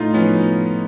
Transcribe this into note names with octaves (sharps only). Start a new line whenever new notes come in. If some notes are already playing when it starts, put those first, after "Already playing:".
Already playing: A2 A3 D#4 F4
F3 B3 C#4